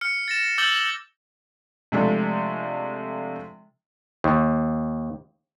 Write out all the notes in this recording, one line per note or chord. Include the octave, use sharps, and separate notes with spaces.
F6 C#7
A6 A#6 E7
D6 E6 G6 A6 F#7 G7
C3 F3 G#3 A3 D4 A4
D#2